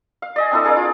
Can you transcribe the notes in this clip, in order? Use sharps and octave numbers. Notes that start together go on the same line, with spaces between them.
F5
D5 D#5 G#5
C4 D4 E4 A4
G#4 A#4 D5 F5
F4